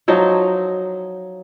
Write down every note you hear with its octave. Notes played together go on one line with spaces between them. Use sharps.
F3 F#3 D#4